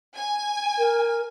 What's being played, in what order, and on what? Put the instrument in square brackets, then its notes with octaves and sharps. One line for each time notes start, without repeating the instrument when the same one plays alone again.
[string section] G#5
[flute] A#4